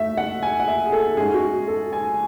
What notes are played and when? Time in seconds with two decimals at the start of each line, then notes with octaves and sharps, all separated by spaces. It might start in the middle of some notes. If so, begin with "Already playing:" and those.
Already playing: A3 E5
0.17 F#5
0.43 G#5
0.60 F#5
0.68 E5
0.86 G#4
0.92 A4
1.17 G#2 G#3 C#4 G#4
1.34 F#4
1.67 A4
1.93 G#5